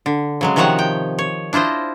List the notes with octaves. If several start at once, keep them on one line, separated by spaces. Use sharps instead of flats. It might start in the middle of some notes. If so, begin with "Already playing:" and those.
D3
C#3 F#3 G#3
C3 D#3 F3 F#4 C#5 F#5
G5
C#5
D4 E4 F4 C5 D#5